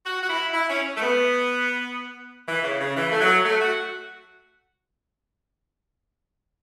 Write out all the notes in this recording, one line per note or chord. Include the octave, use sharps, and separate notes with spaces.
F#4
F#4
E4
E4
C#4
A3
B3
E3
C#3
C#3
E3
A3
F#3
A3
F#4